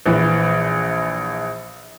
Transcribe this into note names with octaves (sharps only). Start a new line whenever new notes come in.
A#1 E3